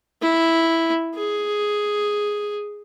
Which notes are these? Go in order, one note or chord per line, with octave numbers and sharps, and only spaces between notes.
E4
G#4